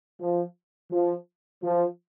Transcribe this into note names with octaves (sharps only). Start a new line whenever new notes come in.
F3
F3
F3